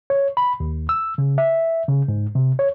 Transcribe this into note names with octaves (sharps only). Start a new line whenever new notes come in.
C#5
B5
D#2
E6
C#3
E5
C#3
G#2
C3
C#5